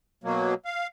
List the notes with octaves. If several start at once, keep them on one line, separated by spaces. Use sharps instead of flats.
B2 F#3 A#3
F5